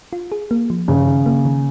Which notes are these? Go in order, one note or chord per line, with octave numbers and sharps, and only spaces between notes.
F4
G#4
A#3
F3
G2 C#3
D#3
A#3
D#3